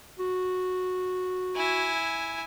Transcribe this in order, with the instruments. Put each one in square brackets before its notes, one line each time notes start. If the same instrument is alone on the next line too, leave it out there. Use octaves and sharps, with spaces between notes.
[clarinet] F#4
[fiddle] E4 G#5